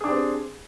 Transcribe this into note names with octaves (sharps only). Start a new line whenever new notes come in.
C4 D4 G4 G#4